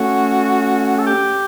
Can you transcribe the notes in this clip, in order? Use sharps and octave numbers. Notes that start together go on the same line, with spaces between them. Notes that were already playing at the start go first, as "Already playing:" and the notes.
Already playing: A3 C#4 F#4
A4
G4